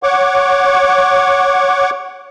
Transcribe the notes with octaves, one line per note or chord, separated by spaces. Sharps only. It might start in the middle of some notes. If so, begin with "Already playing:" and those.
C#5 F#5 C#6 D6